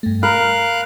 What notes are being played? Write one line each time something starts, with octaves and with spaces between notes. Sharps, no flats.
G2 A3
A#4 F5 B5 F#6